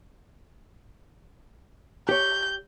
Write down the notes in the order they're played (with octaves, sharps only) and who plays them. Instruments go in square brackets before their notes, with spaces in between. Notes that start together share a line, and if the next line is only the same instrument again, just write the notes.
[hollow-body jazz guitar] G4 C#5 [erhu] G6